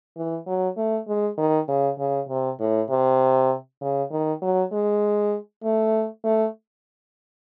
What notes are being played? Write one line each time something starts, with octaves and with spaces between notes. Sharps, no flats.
E3
F#3
A3
G#3
D#3
C#3
C#3
C3
A2
C3
C#3
D#3
F#3
G#3
A3
A3